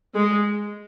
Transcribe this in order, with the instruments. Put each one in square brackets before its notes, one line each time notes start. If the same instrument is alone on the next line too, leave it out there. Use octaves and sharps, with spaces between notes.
[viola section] G#3